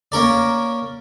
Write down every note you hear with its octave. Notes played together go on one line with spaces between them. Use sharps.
A#3 C#4 A#4 D5